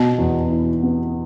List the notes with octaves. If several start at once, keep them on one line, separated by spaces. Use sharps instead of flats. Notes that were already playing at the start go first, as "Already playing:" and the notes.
Already playing: B2 B3
E2
E4
B3